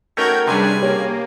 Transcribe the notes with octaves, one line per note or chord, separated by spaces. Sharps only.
A3 C#4 D#4 F#4 A#4 G5 G6 G#6
C3 G3 C#4 D4 G#4 B4 G#5
A#3 G4 C#5